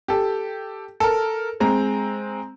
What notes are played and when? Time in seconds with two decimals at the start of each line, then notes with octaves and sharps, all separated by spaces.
0.08 G4 A4
1.00 A4 A#4
1.60 G#3 C4 A#5